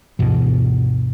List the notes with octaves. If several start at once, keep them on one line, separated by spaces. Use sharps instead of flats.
D2 G2 B2 E3